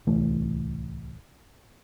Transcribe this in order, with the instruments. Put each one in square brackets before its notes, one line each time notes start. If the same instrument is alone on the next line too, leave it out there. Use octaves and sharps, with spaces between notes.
[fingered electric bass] D1 C2 E3 A3